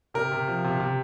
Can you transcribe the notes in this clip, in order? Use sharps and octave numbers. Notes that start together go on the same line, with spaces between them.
C3 A#4
C3
F3
C3
C3